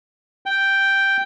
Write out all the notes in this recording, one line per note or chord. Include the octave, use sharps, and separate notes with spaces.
G5